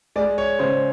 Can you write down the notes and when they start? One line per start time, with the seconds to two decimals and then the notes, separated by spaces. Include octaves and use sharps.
0.16 G#3 D5
0.38 C#5
0.59 C#3 C5